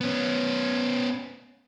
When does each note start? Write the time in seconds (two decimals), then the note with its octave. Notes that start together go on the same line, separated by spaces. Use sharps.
0.01 B3 C#4